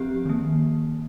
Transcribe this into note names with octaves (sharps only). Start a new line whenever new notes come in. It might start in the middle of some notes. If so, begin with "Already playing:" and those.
Already playing: F3 C4 G4
D#3 A#3